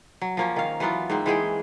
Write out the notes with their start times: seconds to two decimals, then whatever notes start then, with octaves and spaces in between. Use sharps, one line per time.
0.22 F#3
0.37 F3 A#3 C#4
0.56 D#3 F5
0.80 E3 F#3 B3 F4
1.10 G#2 A#3 C4
1.26 E3 G#3 G#4 G5